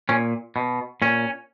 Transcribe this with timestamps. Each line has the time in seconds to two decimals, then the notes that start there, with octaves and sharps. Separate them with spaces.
0.09 A#2 C#4
0.56 B2
1.02 A#2 C#4